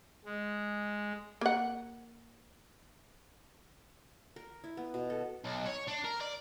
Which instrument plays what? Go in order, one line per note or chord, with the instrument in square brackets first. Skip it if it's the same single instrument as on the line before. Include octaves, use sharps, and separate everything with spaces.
[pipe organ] G#3
[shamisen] A#3 F#5
[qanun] A#4
E4
B3
B2
A4
[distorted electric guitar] B1
C#5
D4
A#4
D5